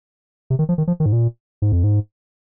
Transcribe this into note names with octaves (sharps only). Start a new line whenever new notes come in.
C3
D#3
F3
D#3
F3
D#3
G#2
A#2
G#2
F2
G#2